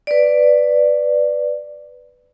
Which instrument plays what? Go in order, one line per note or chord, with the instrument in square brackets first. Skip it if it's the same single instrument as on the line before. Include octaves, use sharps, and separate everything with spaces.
[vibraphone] B4 D5